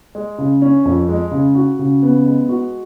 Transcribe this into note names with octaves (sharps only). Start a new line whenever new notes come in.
G#3
C#3
C#4
F2
G#3
C#3
F#4
C#3
B3
G#3
F#4